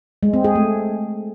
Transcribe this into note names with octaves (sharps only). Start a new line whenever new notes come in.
G#3
C4
G#4
A3